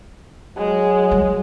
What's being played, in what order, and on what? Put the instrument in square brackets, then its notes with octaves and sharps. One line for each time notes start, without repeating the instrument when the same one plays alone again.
[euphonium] F#3 [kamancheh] G#3
[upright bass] G3